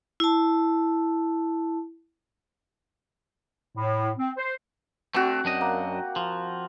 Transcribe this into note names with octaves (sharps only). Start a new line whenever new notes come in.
E4 A5
A2
C4
C5
A3 C4 D4 F#4
F#2 D4 D#5
A#3
F3